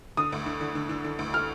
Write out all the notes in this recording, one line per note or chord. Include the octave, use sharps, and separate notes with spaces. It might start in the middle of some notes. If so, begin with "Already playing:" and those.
D3 D#6
D2
D3
D3
D3
D3
D3
D2
F6